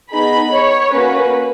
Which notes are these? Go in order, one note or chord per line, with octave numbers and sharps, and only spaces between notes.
B3 D#4 G#4 B5
C#5
A#3 C#4 F#4 B4